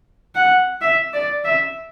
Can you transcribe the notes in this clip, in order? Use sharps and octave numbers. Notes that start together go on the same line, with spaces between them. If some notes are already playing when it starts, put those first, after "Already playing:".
F#5
E5
D5
E5